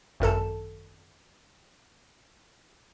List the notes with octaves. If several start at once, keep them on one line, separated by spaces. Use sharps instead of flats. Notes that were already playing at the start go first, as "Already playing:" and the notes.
G#1 F#2 A4 A5